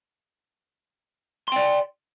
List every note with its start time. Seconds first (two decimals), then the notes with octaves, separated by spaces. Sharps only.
1.48 C6
1.52 G5
1.56 D5